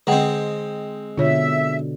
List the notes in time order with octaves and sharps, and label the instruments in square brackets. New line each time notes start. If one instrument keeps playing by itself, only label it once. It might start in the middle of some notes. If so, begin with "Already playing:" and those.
[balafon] D3 F#5 G5 [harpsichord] G#3 C4 [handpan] D#5
[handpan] B2 D3 [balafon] F4 C#5 [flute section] E5